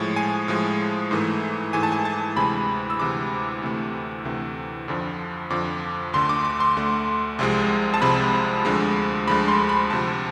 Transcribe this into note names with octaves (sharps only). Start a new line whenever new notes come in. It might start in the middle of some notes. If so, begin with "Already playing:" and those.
Already playing: A2 F3 G#3
G#5
A2 F3 G#3
G#2 E3 A3
G#2 E3 A3 G#5
A5
G#5
A5
D2 C3 E3 G#3 B5
E6
D2 C3 E3 G#3 D6
D2 C3 E3 A3
D2 C3 E3 A3
F2 D3 F3
F2 D3 F3 D6
D2 D3 A3 C6
D6
D6
C6
D2 D3 A3
C2 C3 F3 G#3
A5
C2 C3 F3 G#3 B5
D2 D3 F3 G#3
D2 D3 F3 G#3 B5
C6
B5
D2 C3 F3 A5